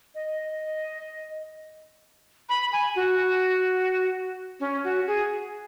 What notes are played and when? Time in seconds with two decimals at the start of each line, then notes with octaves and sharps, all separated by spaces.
0.15 D#5
2.49 B5
2.72 G#5
2.96 F#4
4.60 C#4
4.84 F#4
5.07 G#4